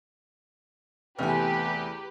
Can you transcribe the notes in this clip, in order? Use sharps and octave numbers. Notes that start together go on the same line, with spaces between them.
E2 C3 A3 G4 B4 G#5 F6